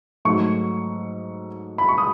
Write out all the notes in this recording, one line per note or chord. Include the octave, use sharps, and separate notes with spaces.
G#2 F#3 A3 C#6
B5
C#6
D#6